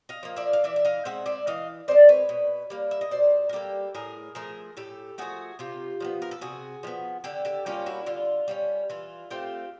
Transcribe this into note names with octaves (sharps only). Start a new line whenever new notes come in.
D#5 F5
F3 A#3
D5 E5
F5
E3 D5 E5
E5
D#5 F5
G#3 C4 E5 F#5
D5 E5
E3 D#5 F5
G#3 C4 C5 D5
B4 C#5
B2
G3 A#3
E5
D#5
B2 C5 D5
A#4
G3 A#3 G4 A4
A2 G#4 A#4
F3 A3 G#4 A#4
A2 G4 A4
F3 A3 F#4 G#4
C3 F4 G4
F3 G#3 B3
A#4
A4
C3 F#4 G#4
F3 G#3 B3
D3 G4 A4
G4 A4
G3 A#3 C#4 F4 G4
E4 F#4
D3 F4
G3 A#3 C#4
E3 F4
A3 C4 F4 G4